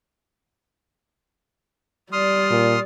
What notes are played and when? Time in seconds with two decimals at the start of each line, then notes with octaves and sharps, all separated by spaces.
2.12 G3 D5 C6 D#6 F6
2.51 A#2